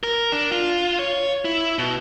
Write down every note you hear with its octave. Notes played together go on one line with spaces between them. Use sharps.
A#4
D4
F4
C#5
E4
B2